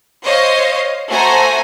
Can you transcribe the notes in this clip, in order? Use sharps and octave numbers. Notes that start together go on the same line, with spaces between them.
C5 C#5 D#5 F5
A3 F#4 C5 G#5 A#5